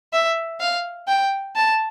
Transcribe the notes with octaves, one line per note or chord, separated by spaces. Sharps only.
E5
F5
G5
A5